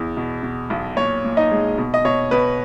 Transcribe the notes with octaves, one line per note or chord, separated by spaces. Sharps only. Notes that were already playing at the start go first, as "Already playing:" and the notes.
Already playing: E2
B2
B2
B1
A#2 C#5
A#2
D#4 D#5
G#3
B2
D#5
B2 C#5
B2 B4